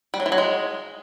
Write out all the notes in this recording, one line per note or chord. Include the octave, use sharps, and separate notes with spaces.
G3
F#3
E3
F#3
G#3